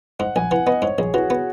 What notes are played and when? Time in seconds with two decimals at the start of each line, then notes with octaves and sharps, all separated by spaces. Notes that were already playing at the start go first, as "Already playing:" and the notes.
0.19 G#2 F#5
0.36 A#1 G#5
0.51 E3 F#5
0.66 B3 D#5
0.82 G#2 C#5
0.98 A#1 G#4
1.14 E3 F#4
1.30 B3